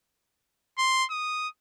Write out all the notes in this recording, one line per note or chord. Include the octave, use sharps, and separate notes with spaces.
C6
D#6